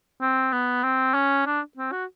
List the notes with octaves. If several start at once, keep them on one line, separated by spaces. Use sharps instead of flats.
C4
B3
C4
C#4
D4
C4
F#4